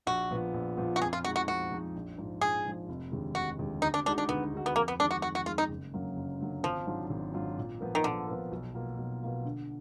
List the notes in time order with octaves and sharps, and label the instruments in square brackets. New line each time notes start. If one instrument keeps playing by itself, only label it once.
[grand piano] A#1 [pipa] F#4
[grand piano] A#2 F3 B3
A#1
A#2 F3 B3
[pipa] F#4
[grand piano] F2 [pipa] G#4
[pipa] F4
[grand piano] F3 G#3 D#4 [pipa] F#4
[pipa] F#4
[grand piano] F2 [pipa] F#4
[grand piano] F3 G#3 D#4
A#1
G#2 F3
[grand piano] A#1 [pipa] G#4
[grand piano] G#2 F3
F1
D#2 D3 G#3
[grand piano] F1 [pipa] F#4
[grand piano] D#2 D3 G#3
[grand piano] D2 [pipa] D#4
[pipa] D4
[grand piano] D3 G#3 D#4 F#4 [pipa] D4
[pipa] D4
[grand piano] D2 [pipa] B3
[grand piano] D3 G#3 D#4 F#4
[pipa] B3
[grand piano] F2 [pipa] A#3
[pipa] B3
[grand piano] D#3 G#3 [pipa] D4
[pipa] F#4
[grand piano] F2 [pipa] F#4
[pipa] F#4
[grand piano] D#3 G#3 [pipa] F4
[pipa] D#4
[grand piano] F#1
F#2 D3 F#3 A#3
F#1
F#2 D3 F#3 A#3
[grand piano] G#1 [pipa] F3
[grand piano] G#2 F#3 D4 F4
G#1
G#2 F#3 D4 F4
A#2
F3 B3 F4 A#4
[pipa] D#3
[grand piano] A#2 [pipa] D3
[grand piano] F3 B3 F4 A#4
B1
B2 A#3 F4
B1
B2 A#3 F4
D3